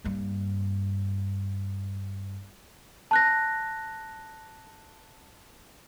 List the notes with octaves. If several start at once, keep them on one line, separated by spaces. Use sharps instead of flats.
G2 A#3
A5 F#6 A#6